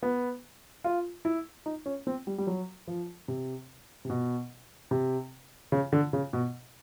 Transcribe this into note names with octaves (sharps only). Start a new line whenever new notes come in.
B3
F4
E4
D#4
C#4
C4
G3
G3
F#3
F3
C3
C3
B2
C3
C#3
D3
C#3
B2